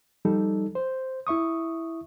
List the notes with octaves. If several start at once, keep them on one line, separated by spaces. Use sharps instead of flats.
F3 G3 D#4 A4
C5
E4 E5 C#6 D#6